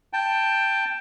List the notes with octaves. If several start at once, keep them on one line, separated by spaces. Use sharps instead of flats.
G5 A5